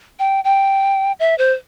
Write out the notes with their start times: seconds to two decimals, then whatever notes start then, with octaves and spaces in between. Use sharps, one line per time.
0.19 G5
0.44 G5
1.20 E5
1.38 C5